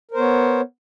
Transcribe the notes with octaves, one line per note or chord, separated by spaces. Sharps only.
B3 A#4 C5 C#5